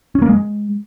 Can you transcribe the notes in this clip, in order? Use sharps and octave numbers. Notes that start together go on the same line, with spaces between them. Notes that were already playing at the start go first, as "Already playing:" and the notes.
C#4
A#3
G#3